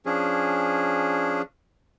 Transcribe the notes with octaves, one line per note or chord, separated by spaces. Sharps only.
F3 C#4 D4 G#4